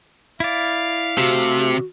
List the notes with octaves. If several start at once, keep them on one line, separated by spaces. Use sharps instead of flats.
E4 D5 F5
C3 A3 F#4 G4 E6